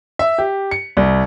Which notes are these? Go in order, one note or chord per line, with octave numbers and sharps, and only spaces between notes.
E5
G4
C#7
C2